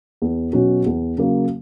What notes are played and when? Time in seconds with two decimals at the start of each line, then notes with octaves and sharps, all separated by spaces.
0.22 E2
0.53 B2 F#3 C#4 F#4
0.86 E2
1.18 C#3 F#3 A#3